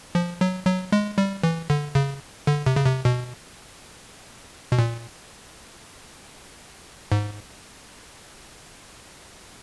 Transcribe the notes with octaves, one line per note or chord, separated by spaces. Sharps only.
F3
F#3
F#3
G#3
G3
E3
D3
C#3
D3
C3
C#3
C3
B2
B2
A#2
G#2